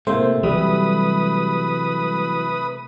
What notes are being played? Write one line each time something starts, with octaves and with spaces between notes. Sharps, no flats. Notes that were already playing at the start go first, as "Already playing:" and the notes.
A2 C3 A3 A#3 C5
E3 F#3 G3 B4 D#6